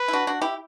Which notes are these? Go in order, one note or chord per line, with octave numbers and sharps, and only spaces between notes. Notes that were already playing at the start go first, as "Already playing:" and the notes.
Already playing: B4
E4
D4 F#4
D4 F#4
E4 G4